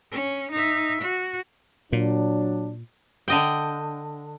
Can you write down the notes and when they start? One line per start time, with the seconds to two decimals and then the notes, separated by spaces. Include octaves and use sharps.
0.11 C#4
0.51 D#4 E5
1.01 F#4
1.93 A#2 F#3 D4
3.28 D3 D#5 G5